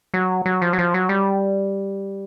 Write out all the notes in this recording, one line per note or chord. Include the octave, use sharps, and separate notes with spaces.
F#3
F#3
F3
F#3
F3
F#3
G3